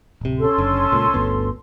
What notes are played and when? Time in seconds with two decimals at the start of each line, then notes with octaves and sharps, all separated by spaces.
0.21 D1 C3
0.39 C#4 A4 C6
0.58 F#1 D3
0.92 C#2 A#2
1.14 G1 D2 B3